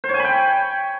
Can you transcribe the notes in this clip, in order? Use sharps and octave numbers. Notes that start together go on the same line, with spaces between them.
C5
C#5
G#5
B5
G5